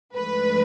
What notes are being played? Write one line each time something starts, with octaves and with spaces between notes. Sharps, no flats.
G#2 F3 A3 D4 B4